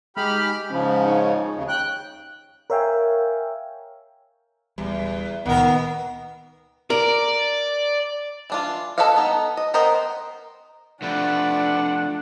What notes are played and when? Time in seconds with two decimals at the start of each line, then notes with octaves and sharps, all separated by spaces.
0.17 G#3 D#4 G4 G#4 B5 F6
0.70 G#2 C#3 F3 C#4
1.05 D#4 C#5
1.56 D#2 C#3
1.68 G5 F#6
2.70 A#4 C#5 E5 F5 G5 G#5
4.78 D1 E2 G3
5.46 C#2 A#2 D#3 B3 A#4
6.90 A#4 D5
8.50 E3 D4 F4
8.98 A4 B4 C#5 D#5 F5
9.16 B3 D#4
9.57 D#5
9.74 B3 A#4 C5 D#5 G5
11.02 F3 A3 D4 B4 D5 F#5